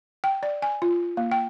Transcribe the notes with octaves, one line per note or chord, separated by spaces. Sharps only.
G5
D5
G#5
F4
A#3
G5